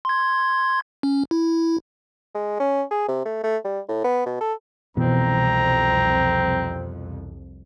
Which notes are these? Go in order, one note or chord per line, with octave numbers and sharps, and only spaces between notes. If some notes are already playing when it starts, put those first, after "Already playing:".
C6 G#6
C#4
E4
G#3
C#4
G#4
C3
A3
A3
G3
A2
B3
B2
A4
C2 F2 B2 E3 C4 A#5